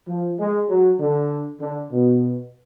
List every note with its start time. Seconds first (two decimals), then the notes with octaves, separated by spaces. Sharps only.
0.08 F3
0.39 G#3
0.69 F#3
1.00 D3
1.60 D3
1.91 B2